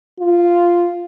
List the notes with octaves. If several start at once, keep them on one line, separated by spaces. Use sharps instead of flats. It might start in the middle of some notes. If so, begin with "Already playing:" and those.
F4